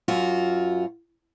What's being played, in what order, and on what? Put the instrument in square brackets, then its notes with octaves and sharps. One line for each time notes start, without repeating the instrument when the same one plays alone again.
[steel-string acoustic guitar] F#2 F4 F#4